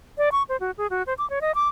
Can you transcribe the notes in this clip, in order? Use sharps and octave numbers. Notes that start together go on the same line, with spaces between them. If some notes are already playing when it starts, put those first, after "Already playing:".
D5
C#6
C5
F#4
G#4
F#4
C5
D6
C#5
D#5
D6